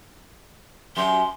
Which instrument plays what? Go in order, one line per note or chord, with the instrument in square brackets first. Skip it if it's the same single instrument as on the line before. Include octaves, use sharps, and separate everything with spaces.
[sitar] F#2 G4 [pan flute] C6